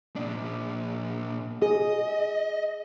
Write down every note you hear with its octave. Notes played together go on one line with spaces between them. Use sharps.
A#2 D4
G#4 D#5